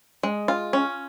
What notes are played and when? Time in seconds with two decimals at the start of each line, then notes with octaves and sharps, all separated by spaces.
0.23 G#3
0.48 F4
0.73 C#4